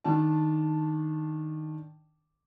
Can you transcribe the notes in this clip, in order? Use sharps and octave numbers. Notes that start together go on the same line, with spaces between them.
D#3 D4 A5